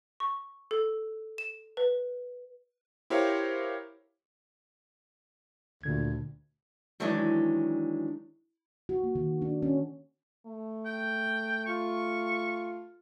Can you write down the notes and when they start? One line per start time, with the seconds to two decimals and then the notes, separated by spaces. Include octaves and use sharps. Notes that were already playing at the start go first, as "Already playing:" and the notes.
0.20 C#6
0.71 A4
1.38 E7
1.77 B4
3.10 E4 G4 A#4 C5 C#5 F5
5.83 D2 A#2 D3 G#6
7.00 D#3 E3 F#3 G#3 D4 D#4
8.89 F#4
9.03 A#3
9.15 D#3
9.42 D4
9.62 C#4
10.46 A3
10.86 G5
11.66 F4 C#6